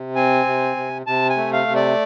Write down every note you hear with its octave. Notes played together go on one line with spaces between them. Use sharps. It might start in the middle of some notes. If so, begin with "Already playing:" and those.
Already playing: C3
C4 G#5
C3
C3
C3 A5
G#5
A3
F5
C3
D5